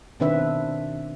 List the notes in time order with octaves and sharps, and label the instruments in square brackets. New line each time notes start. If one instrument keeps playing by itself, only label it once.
[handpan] B2 D#3 C4 D4 B4 E5